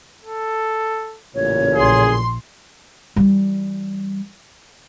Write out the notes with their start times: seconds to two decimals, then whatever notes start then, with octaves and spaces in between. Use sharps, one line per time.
0.23 A4
1.35 A1 A#2 C#3 C#5
1.75 A#1 G#4 C6
3.16 E3 G3